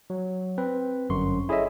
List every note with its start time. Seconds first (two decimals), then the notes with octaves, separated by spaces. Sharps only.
0.10 F#3
0.58 C4 B4
1.10 G1 F#2 C6 C#6
1.49 E4 G#4 A4 C#5 D#5 E5